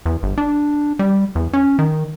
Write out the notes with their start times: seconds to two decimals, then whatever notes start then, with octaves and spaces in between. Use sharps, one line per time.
0.06 E2
0.23 G1
0.38 D4
0.99 G3
1.35 E2
1.53 C#4
1.79 D#3